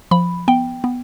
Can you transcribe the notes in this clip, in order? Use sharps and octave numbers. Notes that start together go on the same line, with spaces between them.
F3 B5
B3 G5
B3